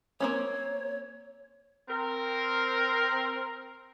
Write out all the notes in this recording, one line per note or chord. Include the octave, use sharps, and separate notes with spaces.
A#3 C4 C#4 C#5
C4 A#4